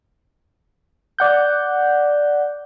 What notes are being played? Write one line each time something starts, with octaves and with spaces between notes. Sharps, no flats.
D5 F#5 G6